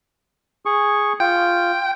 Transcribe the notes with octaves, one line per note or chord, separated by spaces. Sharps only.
G#4 C#6
F4 G5